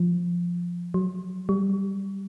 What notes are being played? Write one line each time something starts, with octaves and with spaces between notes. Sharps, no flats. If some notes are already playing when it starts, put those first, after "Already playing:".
Already playing: F3
F#3
G3